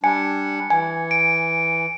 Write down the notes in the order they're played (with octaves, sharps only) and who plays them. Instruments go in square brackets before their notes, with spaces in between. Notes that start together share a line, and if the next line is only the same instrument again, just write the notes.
[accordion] G3 D4 [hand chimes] G#5 [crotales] C#7
[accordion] E3 [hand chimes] G#5
[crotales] D7